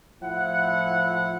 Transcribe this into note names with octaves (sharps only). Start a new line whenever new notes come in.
A2 F3 E4 F#5